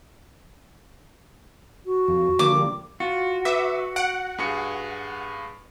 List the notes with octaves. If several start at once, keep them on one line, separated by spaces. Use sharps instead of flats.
F#4
F2
D3 F3 A#3 D6
G3
F4 F#4
B4 E5 D6
F#5 D7
G2 G#4 C#7